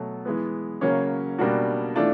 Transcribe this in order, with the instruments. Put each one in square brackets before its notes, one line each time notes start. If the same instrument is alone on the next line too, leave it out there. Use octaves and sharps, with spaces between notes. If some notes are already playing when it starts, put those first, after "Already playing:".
Already playing: [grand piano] B2 F#3 A3
E3 G#3 B3
C#3 F#3 A#3 C#4
B2 G3 A#3 D4 F#4
E3 A3 D4 F4